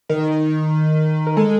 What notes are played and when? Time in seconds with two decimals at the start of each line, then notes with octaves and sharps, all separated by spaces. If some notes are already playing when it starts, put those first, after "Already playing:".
0.09 D#3 A#4
1.27 A#4
1.37 G#3 A4